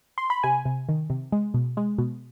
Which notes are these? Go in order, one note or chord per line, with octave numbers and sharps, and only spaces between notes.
C6
B5
C3 G#5
C3
D#3
C3
G#3
B2
G#3
B2